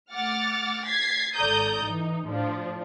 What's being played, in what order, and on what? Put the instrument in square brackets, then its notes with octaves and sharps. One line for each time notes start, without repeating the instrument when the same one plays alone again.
[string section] A3 F#5 D6 F6 A6
G#6 A6 B6 C7
G#1 A4 D5 A#5 D#6 G6
E3 D#4
A2 F3 D4